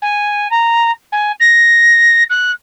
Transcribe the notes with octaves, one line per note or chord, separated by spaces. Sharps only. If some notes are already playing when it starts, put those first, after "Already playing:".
G#5
A#5
G#5
A#6
F#6